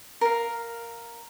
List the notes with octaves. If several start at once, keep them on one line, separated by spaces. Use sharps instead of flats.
A#4 F5